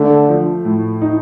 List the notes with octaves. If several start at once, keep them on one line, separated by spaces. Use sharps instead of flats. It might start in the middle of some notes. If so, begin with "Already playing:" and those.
Already playing: D3 A3
F3
A2
D#4